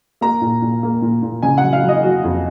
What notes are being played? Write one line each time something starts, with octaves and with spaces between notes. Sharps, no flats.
A#3 A#5
A#2
A#2
A#3
A#2
A#2
C#3 G#5
F#5
F#3
F5
F#3
D#5
F#3 F#4
F2